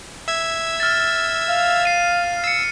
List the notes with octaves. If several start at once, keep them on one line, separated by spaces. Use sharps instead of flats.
E5 E6 G#6
F6 A6
F5
C7 D#7
E6 C7 C#7